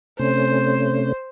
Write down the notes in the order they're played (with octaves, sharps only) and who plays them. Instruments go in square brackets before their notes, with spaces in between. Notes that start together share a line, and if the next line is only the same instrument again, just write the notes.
[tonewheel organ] C3 A3 C#4 [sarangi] C5